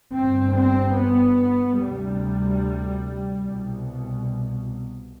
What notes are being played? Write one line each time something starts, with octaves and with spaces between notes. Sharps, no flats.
G1 G2 C4
C4
B3
D2 C3 G3
C2 B2